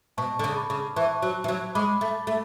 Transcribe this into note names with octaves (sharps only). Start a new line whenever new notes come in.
B2 A5 C#6
D3
C#3
B5 D6
C#3
E3 A5 C#6
F#3
E3
F#3
G#3 B5 D6
A3
A3